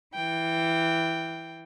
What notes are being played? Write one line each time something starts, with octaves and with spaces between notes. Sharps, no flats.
E3 G5